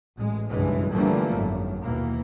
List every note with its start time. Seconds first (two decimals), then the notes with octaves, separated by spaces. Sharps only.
0.18 A1 G#3
0.51 F#1 B1 G2 E3 G#3
0.92 D3 E3 F3 G3 A3 A#3
1.34 G#1 F#2
1.83 D#2 B2 E3 A#3